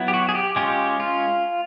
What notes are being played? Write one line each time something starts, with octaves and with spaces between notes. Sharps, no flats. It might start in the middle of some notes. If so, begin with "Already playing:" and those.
Already playing: F#3 B3 E4
G4
F#4
G#4
G4
G#3 C#4 F4 G4
F4